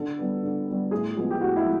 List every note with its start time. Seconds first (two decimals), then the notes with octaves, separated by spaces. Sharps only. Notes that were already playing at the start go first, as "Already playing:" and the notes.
Already playing: D3 A4
0.18 G3 B3
0.43 D3
0.68 G3 B3
0.91 A2 G#4
1.16 F3 G#3 B3 G#4
1.31 G4
1.40 A2 F#4
1.56 E4
1.65 F3 G#3